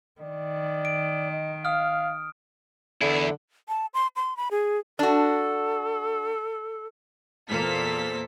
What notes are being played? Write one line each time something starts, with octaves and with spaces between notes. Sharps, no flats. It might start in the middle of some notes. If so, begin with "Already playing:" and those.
D#3 D5
D7
D#5
F5 D#6 F6
E2 D3 E4
A5
C6
C6
B5
G#4
D4 F#4 A4
E2 A#2 A#3 A4 C5 B6